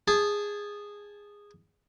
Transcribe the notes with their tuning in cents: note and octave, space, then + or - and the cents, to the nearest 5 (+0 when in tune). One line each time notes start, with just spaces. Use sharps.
G#4 -15 A5 -25